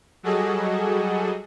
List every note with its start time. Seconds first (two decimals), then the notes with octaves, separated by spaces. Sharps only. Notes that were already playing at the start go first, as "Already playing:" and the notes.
0.23 F#3 G3 F#4 G#4 A4 D#5